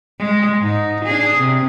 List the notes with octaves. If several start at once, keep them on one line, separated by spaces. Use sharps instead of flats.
G#3
G#2 D#4
D4 G#4
C3